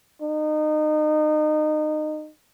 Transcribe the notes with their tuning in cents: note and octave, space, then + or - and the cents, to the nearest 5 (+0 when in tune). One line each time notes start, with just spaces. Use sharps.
D#4 -25